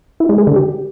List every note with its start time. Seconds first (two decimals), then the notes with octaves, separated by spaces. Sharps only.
0.20 E4
0.29 G#3
0.38 G#4
0.47 D3
0.56 G4